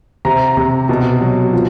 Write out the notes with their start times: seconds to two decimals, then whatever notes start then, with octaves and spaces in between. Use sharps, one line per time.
0.25 C3 A#5
0.57 C3
0.89 B2
1.21 F#3
1.53 F3